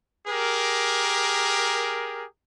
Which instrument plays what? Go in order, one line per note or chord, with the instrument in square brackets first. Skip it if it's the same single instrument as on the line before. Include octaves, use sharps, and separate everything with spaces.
[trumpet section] G4 G#4 A#4